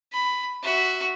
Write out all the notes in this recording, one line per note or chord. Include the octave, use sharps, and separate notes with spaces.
B5
F#4 E5